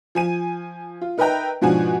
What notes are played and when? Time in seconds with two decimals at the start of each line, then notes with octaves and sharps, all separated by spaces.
0.15 F3 G#5 D#7
1.01 F4
1.18 D#4 A#4 B4 E5 G5 A#5
1.62 G#2 B2 F3 D4 F#5 G#5